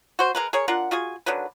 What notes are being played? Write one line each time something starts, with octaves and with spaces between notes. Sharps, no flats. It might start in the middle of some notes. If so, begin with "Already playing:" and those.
F#4 C5
G#3 A#4 B4
G#4 A#4 C#5
D4 F4 A#4 F#5
F4 F#4 G#4 G#5
D3 D#3 F#3 B4